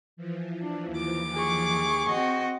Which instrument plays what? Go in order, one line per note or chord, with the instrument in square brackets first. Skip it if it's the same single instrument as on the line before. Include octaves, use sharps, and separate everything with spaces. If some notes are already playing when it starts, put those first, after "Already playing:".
[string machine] E3 F3
[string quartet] D4
D#2 D6
[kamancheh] G#4 C#6
[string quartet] C4 F#4 D#5